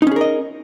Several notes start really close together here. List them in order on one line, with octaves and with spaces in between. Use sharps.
D#4 C#4 G#4 A#4 D#5